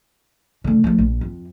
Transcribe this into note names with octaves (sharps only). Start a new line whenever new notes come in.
D3 A3
F3 A3
A#1
F2